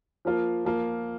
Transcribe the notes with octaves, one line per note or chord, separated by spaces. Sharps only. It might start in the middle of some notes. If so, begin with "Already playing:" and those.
F3 A#3 F4
F3 A#3 F4